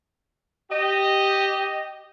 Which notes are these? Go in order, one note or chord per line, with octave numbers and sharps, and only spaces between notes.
G4 D#5